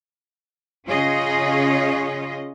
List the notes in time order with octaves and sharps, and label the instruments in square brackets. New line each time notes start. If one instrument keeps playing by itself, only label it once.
[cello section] C#3 C#4 F4 G#4 C#5 D#5